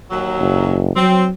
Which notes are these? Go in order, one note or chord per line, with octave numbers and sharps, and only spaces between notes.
D#2 F#3
F#1
F#3 C4